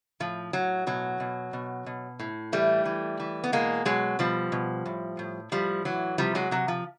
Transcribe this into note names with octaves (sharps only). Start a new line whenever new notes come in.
A2 F3
A2 F#3
B2 F#3
B2
B2
B2
A2
E3 G3 A3
E3
E3
B3
B2 G#3 A#3
B2 F#3 G#3
B2 F3 G3
B2
A2
A2
A2 F3 G3
E3 F#3
C3 F3 G3
F#3 G#3
C3 F#3
F3